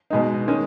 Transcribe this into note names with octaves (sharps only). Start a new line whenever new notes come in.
B2 G#3 D#4
D#3 G#3 C#4